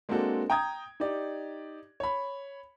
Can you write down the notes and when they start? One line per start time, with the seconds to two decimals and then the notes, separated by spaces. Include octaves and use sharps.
0.09 G#3 A#3 C4 D4 F#4 A4
0.50 G5 A#5 D#6 G#6
1.00 D#4 G4 D5
2.00 C#5 B5